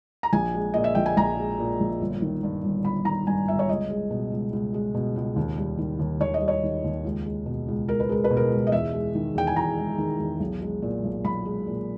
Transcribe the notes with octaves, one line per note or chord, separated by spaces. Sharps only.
A#5
A#1 G#5
G#3
A#2 D#5
E5
A#1 G5
G#5
A#1 A#5
G#3
A#2
A#1
G1
D#3
G2
G1
G1 B5
D#3 A#5
G2 G#5
G1 E5
C#5
C#2 D#5
G#3
B2
C#2
C#2
G#3
B2
C#2
D#2
G3
D#3
D#2
D#2 C#5
D#5
G3
C#5
D#3
D#2
C#2
G#3
B2
C#2
C#2 A#4
B4
G#3 A#4
B4
B2
A#4
C#2
D#5
E2 E5
G#3
D#3
E2 G5
G#5
E2 A#5
G#3
D#3
E2
B1
G#3
A#2
B1
B1 B5
G#3
A#2